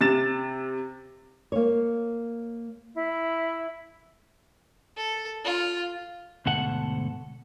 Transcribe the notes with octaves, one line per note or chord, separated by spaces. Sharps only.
C3 A6 E7
A#3 C#5
E4
A4
F4
D2 G#2 B2 A4 F#5